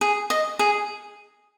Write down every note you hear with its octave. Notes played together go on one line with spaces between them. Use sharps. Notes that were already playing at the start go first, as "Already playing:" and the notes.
G#4
D#5
G#4